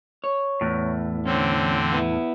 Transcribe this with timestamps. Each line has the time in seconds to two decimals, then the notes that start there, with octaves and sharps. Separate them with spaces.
0.24 C#5
0.61 E2 A2
1.25 D3 C4 C#4
1.93 B3 E4